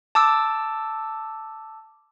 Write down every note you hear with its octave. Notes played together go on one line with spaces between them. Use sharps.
A5 D6 E6